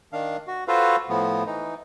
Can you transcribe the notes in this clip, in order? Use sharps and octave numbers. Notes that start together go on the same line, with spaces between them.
D#3 D4 F5
F#4
F4 F#4 A4 B4 C5 F5
A2 F3 B3
E3 D#4